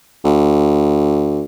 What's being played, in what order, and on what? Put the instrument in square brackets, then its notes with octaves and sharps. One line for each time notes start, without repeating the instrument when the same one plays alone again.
[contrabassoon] D2